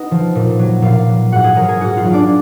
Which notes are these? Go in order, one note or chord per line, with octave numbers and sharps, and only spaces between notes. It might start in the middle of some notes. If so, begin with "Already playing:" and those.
Already playing: B3 D#4 B4 D#5
F3
A#2
F#3
A#2 F4 F5
F#3
G#2 F#4 F#5
G#4 G#5
F#3 A#4 A#5
G#4 G#5
G#2 F#4 F#5
F4 F5
F#3
D4 D5